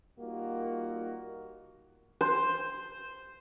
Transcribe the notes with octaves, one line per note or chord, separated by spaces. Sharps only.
G3 A#3 D#4 F4 F#4
C5